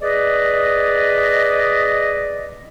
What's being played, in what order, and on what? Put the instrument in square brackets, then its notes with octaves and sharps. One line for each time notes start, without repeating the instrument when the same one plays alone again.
[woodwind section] G#4 B4 D5 D#5